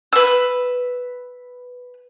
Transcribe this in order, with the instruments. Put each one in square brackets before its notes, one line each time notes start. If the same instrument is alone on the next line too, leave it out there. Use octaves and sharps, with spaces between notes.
[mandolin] B4 E6